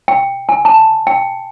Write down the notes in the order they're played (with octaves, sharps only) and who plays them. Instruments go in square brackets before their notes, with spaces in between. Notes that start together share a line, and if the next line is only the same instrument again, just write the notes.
[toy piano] G5
G#5
A5
G5